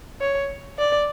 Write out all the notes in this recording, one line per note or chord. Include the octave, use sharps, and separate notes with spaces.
C#5
D5